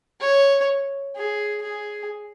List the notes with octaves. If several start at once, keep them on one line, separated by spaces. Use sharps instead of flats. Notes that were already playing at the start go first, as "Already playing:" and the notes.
C#5
G#4
G#4